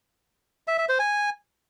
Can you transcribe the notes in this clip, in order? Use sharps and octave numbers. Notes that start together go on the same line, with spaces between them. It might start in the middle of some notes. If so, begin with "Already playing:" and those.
E5
E5
C5
G#5